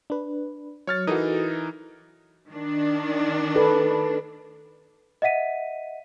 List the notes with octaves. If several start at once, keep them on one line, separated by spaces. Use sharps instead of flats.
D4 B4
F#3 C#5 F6 A6
E3 D#4 F#4 A4 A#4 D#6
D#3 D4
A4 B4
D#5 E5 F#5 B6 D#7